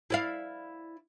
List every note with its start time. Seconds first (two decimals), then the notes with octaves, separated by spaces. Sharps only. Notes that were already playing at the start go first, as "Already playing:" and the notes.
0.10 E4 D5 F5